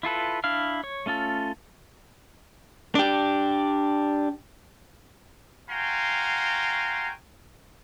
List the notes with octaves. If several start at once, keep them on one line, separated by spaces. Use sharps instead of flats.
E4 F4 A4 B4
D4 E4 F5 F6
C#5
A3 C#4 F4 A4
D4 G4
F#4 F5 G5 G#5 A#5 C6